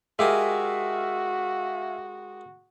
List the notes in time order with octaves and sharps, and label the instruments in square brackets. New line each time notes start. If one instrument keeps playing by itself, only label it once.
[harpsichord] G#3 G4 A#4 [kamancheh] F#4 [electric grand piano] E5 F5 G#5